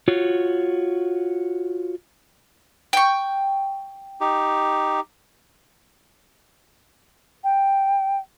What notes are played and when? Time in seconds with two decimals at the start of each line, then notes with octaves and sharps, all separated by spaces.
0.08 F4 F#4 C#5
2.93 G5 C#6
4.21 D#4 G4
7.44 G5